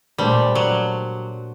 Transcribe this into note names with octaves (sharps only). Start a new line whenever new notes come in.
A#2 G3 A3 D4 A4 C5
F#3